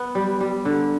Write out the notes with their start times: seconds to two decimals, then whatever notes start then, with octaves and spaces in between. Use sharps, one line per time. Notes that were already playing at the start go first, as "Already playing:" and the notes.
Already playing: B3
0.15 G3
0.40 G3
0.65 D3